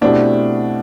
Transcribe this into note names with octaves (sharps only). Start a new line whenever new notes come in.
B2 A3 C4 D4 E4 G4